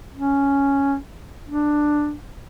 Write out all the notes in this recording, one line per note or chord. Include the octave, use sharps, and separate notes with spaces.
C#4
D4